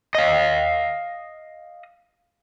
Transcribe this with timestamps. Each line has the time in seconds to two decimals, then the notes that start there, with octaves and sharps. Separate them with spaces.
0.15 D#5 F5